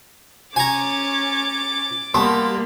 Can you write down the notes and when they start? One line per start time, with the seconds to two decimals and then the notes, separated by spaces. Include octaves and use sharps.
0.56 C#4 C#5 G#5 A#5 D6 A6
2.14 G3 A#3 B3 A5 C6